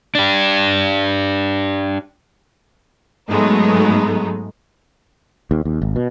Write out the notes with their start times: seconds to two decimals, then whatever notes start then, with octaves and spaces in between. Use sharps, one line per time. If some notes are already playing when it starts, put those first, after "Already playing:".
0.15 D4 G4
3.29 G#2 F#3 G#3 A3 B3 D#4
5.51 D#2
5.65 D#2
5.82 G#1
5.96 B2